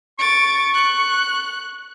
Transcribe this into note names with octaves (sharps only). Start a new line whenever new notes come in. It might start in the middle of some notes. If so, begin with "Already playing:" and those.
C#6 A6 D7
F#6